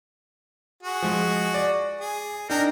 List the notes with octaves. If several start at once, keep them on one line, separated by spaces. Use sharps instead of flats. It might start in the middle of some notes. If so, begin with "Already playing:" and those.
F#4 G#4
F3 G#3
D5
G#4
D4 D#4 A#4 G5